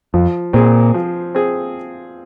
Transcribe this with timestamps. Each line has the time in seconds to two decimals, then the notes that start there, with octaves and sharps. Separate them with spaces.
0.14 F2 F3
0.53 A#2 C4 G#4
0.94 F3
1.35 C4 G#4